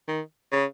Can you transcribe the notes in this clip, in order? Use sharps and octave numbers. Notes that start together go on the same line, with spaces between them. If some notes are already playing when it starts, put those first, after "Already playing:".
D#3
C#3